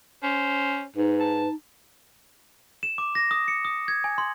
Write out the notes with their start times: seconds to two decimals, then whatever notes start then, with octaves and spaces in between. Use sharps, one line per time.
0.23 C#4 C5
0.96 G#2 D#4 B4
1.20 A5
2.83 E7
2.98 D6
3.15 A#6
3.31 D#6
3.48 C#7
3.65 D#6
3.88 G#6
4.04 G#5
4.18 C6